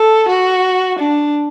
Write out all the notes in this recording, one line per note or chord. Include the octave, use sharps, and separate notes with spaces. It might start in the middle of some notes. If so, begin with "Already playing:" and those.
Already playing: A4
F#4
D4